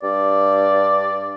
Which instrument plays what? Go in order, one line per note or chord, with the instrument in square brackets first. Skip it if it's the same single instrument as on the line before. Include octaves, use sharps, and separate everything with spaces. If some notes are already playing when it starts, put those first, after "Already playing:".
[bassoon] G2 [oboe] D5